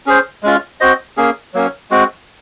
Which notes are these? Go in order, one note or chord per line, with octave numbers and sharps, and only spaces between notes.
C#4 G#4 C5
G#3 C#4 F4
C4 F#4 C5 D#5
A#3 C#4 G#4
F#3 A#3 C#4
G#3 C4 F#4